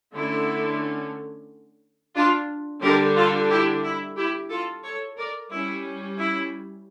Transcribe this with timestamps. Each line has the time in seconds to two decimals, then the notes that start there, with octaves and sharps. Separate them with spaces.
0.14 D3 A3 C#4 E4
2.15 D4 F4
2.82 D3 G3 D4 G4 A#4
3.17 F4 A4
3.50 E4 G4
3.84 E4
4.17 E4 G4
4.51 F4 A4
4.84 A4 C#5
5.18 A#4 D5
5.51 G3 C#4 E4
6.18 E4